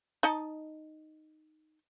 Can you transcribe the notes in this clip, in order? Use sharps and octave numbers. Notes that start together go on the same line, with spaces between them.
D#4 D#5 A5